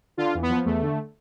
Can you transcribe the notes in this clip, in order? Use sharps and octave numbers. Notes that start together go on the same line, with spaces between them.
D3 F4
E2
B3
F3
E2 A3
D3